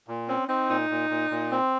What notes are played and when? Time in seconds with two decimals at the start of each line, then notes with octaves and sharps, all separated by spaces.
0.08 A#2
0.28 C4 C#4
0.48 C4 D#4
0.70 A#2 D#4
0.90 A#2
1.10 A#2
1.30 A#2
1.51 C4